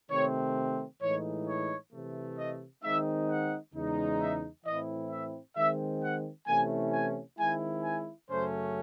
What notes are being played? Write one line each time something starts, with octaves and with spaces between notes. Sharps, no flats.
C3 D#3 A3 C4 C#5
A2 E3 G#3 D#4 C#5
C#5
C3 E3 A3
D#5
D#3 G#3 C4 D#4 E5
F#5
E2 C#3 G#3 D#4
E5
A2 E3 C4 E4 D#5
E5
D#3 G#3 C4 E5
F#5
C3 E3 A3 C#4 E4 G#5
G#5
D#3 G#3 C4 E4 G#5
G#5
F#2 C#3 F#3 A3 C#4 C5